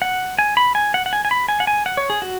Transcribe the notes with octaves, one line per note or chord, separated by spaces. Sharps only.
F#5
G#5
B5
G#5
F#5
F#5
G#5
G#5
B5
G#5
F#5
G#5
F#5
C#5
G#4
F#4